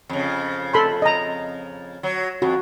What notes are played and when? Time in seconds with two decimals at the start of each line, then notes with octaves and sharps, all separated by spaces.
0.09 F2 C#3
0.73 A4 B5 C6
1.02 D#5 A#5
2.03 F#3
2.42 F2 F#4